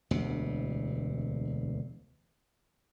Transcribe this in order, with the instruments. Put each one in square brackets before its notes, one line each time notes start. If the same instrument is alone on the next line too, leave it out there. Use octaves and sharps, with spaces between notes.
[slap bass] E1 D2 C3